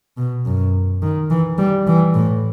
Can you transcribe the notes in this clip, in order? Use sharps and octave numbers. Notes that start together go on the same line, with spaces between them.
B2
F#2
D#3
E3
G3
E3
A2